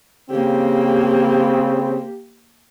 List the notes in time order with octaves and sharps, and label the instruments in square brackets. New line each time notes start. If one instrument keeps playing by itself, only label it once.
[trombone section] C#3 C4 [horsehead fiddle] A#3 G4